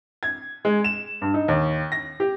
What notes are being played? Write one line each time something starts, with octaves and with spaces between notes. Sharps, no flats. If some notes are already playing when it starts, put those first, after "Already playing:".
G#6
G#3
E7
G2
D#4
D#2
A#6
G4